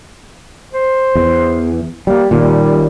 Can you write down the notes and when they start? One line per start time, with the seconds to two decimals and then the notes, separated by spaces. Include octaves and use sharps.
0.73 C5
1.15 E2
2.07 G3 A#3
2.31 D#1 D#2 A#2 G3